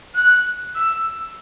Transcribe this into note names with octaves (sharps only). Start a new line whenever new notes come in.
F#6
E6